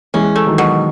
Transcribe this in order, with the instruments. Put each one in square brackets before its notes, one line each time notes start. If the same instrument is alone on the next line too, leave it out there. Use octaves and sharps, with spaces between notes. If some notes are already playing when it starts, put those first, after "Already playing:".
[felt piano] E3 G#3 [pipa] C#4
[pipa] A3
[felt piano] D#3 F#3
[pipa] B2